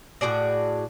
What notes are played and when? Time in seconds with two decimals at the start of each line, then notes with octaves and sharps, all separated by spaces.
0.21 A2 F#4 G#4 D5